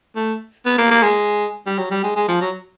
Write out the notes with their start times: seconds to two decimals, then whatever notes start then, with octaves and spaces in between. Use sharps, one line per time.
0.16 A3
0.66 B3
0.78 A#3
0.91 A#3
1.03 G#3
1.66 G3
1.78 F#3
1.91 G3
2.04 G#3
2.16 G#3
2.28 F3
2.41 F#3